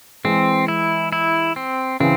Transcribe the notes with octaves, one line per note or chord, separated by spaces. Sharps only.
E3 G#3 C4
E4
E4
C4
C#3 E3 C4